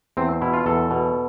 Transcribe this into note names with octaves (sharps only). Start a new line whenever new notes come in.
E2 C4
B2 E4
F4
E2 A4
B2